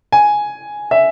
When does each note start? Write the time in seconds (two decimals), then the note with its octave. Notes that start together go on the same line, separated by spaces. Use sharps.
0.12 G#5
0.91 E5